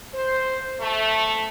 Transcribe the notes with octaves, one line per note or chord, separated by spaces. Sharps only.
C5
A3